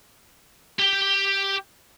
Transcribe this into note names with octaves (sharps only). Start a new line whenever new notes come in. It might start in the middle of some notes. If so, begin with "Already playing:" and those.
G4 G5